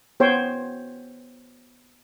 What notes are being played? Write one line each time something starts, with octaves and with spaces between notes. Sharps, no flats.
B3 C5 C#5 G5